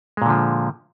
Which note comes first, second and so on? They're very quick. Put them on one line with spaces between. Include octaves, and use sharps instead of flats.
G#3 A#2 D3 F3